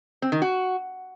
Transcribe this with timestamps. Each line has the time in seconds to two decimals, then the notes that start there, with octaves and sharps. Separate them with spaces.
0.22 C4
0.32 D#3
0.42 F#4